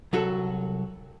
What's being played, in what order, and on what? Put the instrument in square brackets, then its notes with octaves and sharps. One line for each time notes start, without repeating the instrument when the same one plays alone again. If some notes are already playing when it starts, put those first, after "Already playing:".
[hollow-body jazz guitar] C2 F#3 F#4 A4